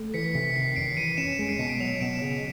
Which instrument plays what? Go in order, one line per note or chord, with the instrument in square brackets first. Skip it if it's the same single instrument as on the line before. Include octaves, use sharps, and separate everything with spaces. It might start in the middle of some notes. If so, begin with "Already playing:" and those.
Already playing: [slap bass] A3
[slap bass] E3 [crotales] B6 C#7
[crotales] B6 C#7
[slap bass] C3 [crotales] B6
[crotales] B6
[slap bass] D#3 [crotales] C7
[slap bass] F#2 [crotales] C7 D7
[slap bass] E3 [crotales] C#7 D#7
[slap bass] C#4 [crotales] D7 E7
[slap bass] G#3
[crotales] C7 D7
[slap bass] B2 [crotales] B6 C#7
[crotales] C7 D7
[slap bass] F#3 [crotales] D#7 F7
[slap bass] B2 [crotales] D7 E7
[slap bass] C#3